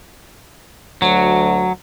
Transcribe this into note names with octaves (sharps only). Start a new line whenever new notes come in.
D2 F#3